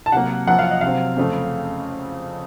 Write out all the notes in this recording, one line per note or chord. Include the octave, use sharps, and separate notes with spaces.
A5
C3 F#3 A#3 F#5
F#2 F3 A#3 F#5
F5
D#5
C3 F#3 C4 F5
F2 C#3 A3 C4